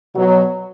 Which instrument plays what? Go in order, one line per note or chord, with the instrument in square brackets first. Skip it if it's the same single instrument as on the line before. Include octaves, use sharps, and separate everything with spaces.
[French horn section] B2 F#3